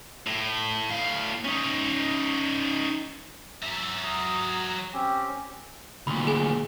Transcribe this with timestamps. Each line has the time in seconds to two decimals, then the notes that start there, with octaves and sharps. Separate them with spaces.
0.27 A2
0.91 A2 F5
1.45 C#4 D#4
3.63 F#3 E5
4.04 A#5 D#6
4.93 C4 C#4 G4
6.07 D2 A#2 B5
6.27 G#4 G#5